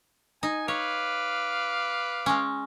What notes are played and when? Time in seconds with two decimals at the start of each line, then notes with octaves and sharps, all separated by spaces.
0.43 D#4 G#5
0.68 B4 C#5 F5 D6
2.26 G#3 C#4